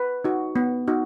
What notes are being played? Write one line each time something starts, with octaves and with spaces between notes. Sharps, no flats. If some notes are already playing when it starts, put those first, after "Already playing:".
Already playing: B4
D#4 F#4
B3
D#4 F#4